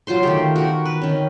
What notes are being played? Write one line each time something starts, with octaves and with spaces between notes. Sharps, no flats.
F#3 F4 C5 C6
D#3 A3 G4
F#4 A#4
B4
D#3 C#4